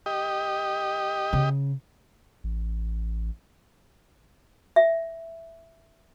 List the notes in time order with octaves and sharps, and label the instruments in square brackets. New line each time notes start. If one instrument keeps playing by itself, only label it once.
[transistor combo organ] G4 D#5
[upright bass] C#3
[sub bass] A1
[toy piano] E5